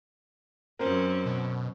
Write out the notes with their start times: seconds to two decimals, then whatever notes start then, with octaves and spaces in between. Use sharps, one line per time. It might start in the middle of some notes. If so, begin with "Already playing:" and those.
0.79 F#2 C4 C#4 A#4 C5
1.26 B2